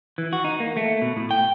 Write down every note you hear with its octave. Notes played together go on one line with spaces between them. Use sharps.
E3
F#4
D#4
A#3
A3
B2
A2
G5